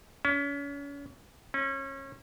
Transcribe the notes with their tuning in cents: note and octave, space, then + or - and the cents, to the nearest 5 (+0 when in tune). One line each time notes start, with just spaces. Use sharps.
C#4 +35
C#4 -30